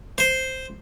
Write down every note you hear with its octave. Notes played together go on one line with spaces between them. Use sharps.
C5